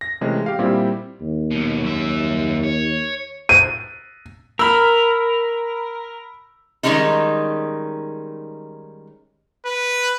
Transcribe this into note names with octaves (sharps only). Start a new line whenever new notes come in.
A#6
C3 E3 G#3 A3 C#4
G4 F5
A#2 G3 C4 E4 G4
D#2
B1 B2
F#2 E5
C#5
D#7
A#4 B5 E6
D#3 G3 G#3 C#4 D#4
B4